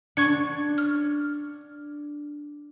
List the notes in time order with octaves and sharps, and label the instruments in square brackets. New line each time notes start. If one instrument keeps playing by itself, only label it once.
[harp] D4 [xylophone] C#6 G#6 C#7
[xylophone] F6